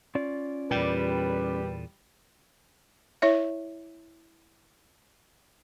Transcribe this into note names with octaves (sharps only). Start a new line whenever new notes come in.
C#4 F4 D5
E2 A#2 G3 B4
E4 C#5 E5